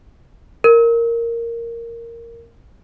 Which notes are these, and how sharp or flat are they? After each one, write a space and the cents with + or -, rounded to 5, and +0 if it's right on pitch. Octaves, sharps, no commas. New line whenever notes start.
A#4 -5